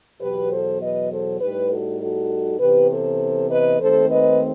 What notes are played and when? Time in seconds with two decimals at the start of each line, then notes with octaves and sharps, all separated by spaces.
0.20 E2 B2 F#3 G4 B4
0.50 A4 C5
0.80 B4 D#5
1.10 A4 C5
1.40 A2 G3 D#4 G4 B4
1.70 F#4 A4
2.00 F#4 A4
2.60 C3 E3 B3 G4 B4
2.90 A4 C5
3.50 B4 D#5
3.80 D#2 D#3 A3 C4 D#4 A4 C5
4.10 B4 D#5